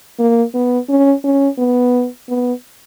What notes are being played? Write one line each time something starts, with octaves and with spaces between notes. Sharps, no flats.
A#3
B3
C#4
C#4
B3
B3